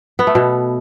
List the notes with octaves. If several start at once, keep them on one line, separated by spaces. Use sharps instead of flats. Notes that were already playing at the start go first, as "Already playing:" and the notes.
B3
A3
B2